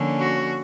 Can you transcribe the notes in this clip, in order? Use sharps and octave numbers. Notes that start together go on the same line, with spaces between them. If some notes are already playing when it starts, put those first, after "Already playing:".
Already playing: D3 F3 A#3 C#4
F#4